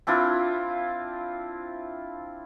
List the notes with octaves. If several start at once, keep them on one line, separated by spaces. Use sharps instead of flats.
C4 D4 E4 F4